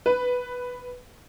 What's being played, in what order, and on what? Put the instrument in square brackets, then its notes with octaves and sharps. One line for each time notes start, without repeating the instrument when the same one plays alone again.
[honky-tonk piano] B4